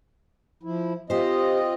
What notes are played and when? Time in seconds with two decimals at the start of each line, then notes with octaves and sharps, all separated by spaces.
0.63 F3 E4
1.10 C4 F4 G4 C5 D#5